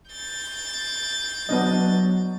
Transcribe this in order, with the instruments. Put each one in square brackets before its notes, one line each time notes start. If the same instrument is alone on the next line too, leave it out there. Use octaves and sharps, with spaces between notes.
[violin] G6 A6
[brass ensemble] F#3 [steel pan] B3 D4 D#5